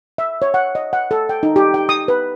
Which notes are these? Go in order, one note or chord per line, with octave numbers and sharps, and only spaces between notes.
E5
C#5
F#5
D#5
F#5
A4
G5
D#4
G4
G5
D#6
B4